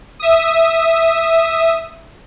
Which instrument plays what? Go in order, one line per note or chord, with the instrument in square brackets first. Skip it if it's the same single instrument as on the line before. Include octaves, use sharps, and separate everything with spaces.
[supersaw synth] E5 D#6